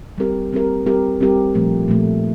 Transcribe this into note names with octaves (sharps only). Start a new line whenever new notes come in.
G3 C4 G4 A#4
G3 C4 G4 A#4
G3 C4 G4 A#4
G3 C4 G4 A#4
A#2 F3 A3
A#2 F3 A3